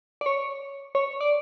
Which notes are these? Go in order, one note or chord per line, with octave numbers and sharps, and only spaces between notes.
D5
C#5
C#5
D5